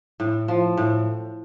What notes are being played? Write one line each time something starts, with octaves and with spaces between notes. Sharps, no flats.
A2
F3
A2